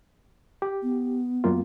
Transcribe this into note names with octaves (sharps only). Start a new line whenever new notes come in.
G4
B3
F#2 A#3 F4